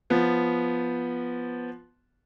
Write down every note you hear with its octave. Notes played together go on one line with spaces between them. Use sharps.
F3 B3